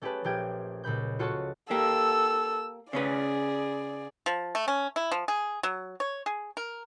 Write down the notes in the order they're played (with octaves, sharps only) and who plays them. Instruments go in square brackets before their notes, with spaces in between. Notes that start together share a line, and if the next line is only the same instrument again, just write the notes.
[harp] A3 C#4 G4 G#4 B4 A5
A#1 A3 F4 G4 G5 G#6
C#2 A#2 B5 G6
F4 F#4 A4 C#5 A5 C#6
[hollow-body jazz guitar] A#3 G4 [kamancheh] A4 E6
[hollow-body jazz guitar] C#3 C#4 B4 [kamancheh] G#4 D5
[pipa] F3
A3
C#4
E4
F3
G#4
F#3
C#5
G#4
A#4